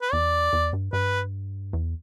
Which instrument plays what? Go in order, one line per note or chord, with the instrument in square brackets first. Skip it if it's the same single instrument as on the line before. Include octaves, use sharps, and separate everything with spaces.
[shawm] B4
[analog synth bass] E2 [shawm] D5
[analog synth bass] E2
G2
[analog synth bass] G2 [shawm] B4
[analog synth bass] E2